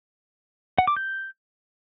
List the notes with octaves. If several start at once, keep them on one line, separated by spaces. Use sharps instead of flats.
F#5
D6
G6